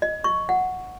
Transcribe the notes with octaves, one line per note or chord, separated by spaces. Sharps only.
D#5
C#6
F#5